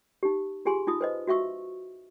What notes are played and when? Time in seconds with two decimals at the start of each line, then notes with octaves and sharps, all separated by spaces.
0.23 D#4 G4
0.65 F4 G4 G#4 G#5 C6
0.87 D#4 F4 D#6
1.01 B4 C5 D#5
1.27 F#4 E5 F5 C#6 E6